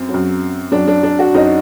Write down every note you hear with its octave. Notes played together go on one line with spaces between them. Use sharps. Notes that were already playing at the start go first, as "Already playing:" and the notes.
Already playing: F#2 C4
F#3
F#2
F#2 F#3 D4
D4
D4
F#4
F#2 F#3 D#4